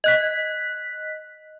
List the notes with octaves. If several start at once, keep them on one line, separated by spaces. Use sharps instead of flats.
D#5 F#6 B6